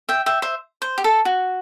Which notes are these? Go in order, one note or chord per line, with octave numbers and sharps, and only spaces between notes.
E5 G5
E5 G5
C5 E5
C5
G4
A4
F#4